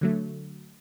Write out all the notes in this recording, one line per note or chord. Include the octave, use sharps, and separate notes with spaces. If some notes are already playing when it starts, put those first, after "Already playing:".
D3 F#3 A3